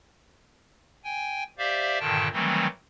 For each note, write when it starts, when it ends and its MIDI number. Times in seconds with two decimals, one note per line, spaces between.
1.04 1.43 79
1.04 1.43 80
1.58 1.99 67
1.58 1.99 72
1.58 1.99 74
1.58 1.99 76
1.58 1.99 77
2.00 2.28 43
2.00 2.28 46
2.00 2.28 50
2.00 2.28 51
2.00 2.28 79
2.00 2.28 81
2.33 2.67 51
2.33 2.67 52
2.33 2.67 54
2.33 2.67 55
2.33 2.67 57
2.33 2.67 60